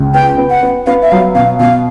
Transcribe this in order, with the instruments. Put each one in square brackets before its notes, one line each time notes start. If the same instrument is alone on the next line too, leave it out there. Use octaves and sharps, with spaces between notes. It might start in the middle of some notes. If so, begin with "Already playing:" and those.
Already playing: [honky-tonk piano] C#2
[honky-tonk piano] B3 [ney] G5
[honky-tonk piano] B3
[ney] F#5
[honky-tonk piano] B3
[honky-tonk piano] B3 [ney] F5
[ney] E5
[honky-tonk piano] F#3 [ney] F5
[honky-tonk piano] B2 [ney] F5
[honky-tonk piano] B2 [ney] F5